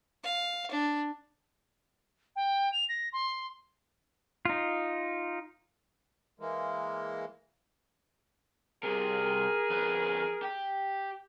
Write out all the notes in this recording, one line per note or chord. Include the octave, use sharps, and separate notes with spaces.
F5
D4
G5
F7
A#6
C6
D#4 F4
E3 G#3 A#3
C2 C3 G#4 A#4
F2 B4
G4